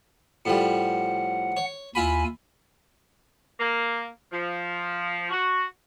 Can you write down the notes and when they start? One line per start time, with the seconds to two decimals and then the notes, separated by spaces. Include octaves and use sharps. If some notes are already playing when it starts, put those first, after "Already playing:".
0.46 A2 F3 G3 F#5
1.57 C#5
1.95 D#2 E4 F4 G#5 B5
3.59 A#3
4.32 F3
5.31 F#4